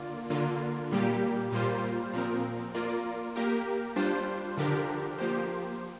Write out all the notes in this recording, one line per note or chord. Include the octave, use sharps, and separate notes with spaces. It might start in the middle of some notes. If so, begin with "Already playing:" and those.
Already playing: D3 A#3 F4 D5
D3 A#3 F4
A#2 G3 A#3 G4
A#2 G3 A#3 F4 C5
A#2 F3 C4 A#4
A#3 F4 A#4 D5
A#3 G4 A#4
G3 D4 F4 C5
D3 F3 D4 G4 A#4
F3 A#3 G4 C5